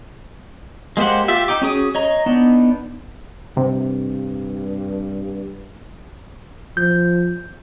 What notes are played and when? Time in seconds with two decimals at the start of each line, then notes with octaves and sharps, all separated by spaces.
0.97 G#3 A#3 G4 C5 F#5
1.28 F4 G4 E5
1.48 D#4 G5 D6
1.62 C#4 F#4 G#4 D#6
1.95 C#5 D#5 A#5
2.26 B3 D4 D#4
3.57 G2 C3
6.77 F3 G6